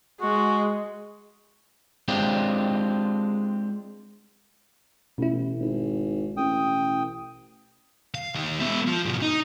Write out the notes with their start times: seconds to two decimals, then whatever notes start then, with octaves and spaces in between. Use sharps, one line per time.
0.21 G#3 F#4
2.08 G#3 C4 D4 F4 G4
5.18 A1 B2 E4
5.60 G#1
6.37 A1 G5 D#6
8.15 F5
8.35 D#2 A#3
8.60 B2 E4
8.86 F3
9.05 G#2 B2
9.22 D#4